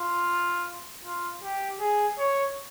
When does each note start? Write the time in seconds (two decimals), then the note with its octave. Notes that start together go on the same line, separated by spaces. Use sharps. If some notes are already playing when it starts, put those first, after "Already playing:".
Already playing: F4
1.05 F4
1.43 G4
1.80 G#4
2.18 C#5